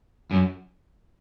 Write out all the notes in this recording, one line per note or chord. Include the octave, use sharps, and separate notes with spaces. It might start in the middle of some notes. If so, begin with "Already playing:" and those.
F#2